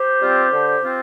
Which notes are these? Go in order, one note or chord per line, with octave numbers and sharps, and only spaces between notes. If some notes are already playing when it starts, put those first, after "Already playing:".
Already playing: G4 C5
G3 C4 F4
D3
C4 F4